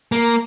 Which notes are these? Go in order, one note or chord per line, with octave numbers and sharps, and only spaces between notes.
A#3